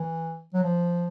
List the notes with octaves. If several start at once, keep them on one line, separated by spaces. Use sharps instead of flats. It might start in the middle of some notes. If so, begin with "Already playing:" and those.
Already playing: E3
F#3
F3